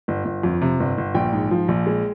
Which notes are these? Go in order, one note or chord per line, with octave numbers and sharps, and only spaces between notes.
G1
G1
F2
C3
G1
G1
A#1 G5
G#2
F3
A#1
G#3